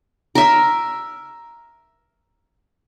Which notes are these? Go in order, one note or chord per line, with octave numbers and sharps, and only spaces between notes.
A#4 E5